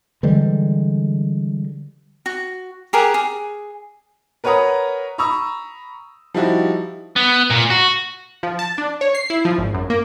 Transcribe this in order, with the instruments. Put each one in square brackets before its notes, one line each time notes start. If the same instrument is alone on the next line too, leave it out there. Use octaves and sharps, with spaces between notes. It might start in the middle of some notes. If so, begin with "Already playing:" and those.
[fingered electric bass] D3 E3 G3 G#3
[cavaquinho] F#4
G4 G#4 A#4 F#5
G#4
[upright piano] A#4 B4 C#5 F#5 A#5 D#6
A#5 B5 C#6 D#6 E6
F3 G3 D#4 E4 F#4
[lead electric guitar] B3
A#2
F#4
[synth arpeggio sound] F3
A5
D4
C#5
C7
E4
F3
G#1
F#2
A#3